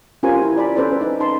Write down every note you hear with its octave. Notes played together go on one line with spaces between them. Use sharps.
C#4 F4 G4 A#4 C5 G#5
E4 A#5
D5 B5
C#4 A4 B4 C5 D5
D#4
D#4 A4 A5 B5 C6